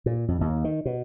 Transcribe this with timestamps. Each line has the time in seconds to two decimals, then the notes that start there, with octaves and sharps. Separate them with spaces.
0.06 A#2
0.28 F2
0.41 D#2
0.64 D#3
0.85 B2